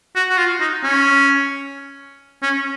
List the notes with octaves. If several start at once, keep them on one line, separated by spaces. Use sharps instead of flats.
F#4
F#4
F4
D#4
C#4
C#4